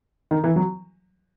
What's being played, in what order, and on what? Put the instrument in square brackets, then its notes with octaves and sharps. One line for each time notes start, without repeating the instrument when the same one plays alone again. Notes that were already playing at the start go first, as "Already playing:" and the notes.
[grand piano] D#3
E3
F#3